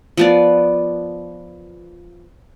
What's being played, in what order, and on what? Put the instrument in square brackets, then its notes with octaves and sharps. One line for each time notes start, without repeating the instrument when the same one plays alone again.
[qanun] F3 B3 D5